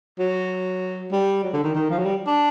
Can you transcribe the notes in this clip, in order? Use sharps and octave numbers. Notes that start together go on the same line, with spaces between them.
F#3
G3
F#3
D3
D#3
D#3
F3
F#3
G3
D4